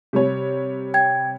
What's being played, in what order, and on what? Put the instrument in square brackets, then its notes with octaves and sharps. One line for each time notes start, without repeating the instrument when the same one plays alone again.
[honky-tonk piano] C3 G3 C#5
[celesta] G5 G#6